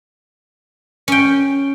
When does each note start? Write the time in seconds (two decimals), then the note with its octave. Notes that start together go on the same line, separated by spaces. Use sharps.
1.08 C#4 G5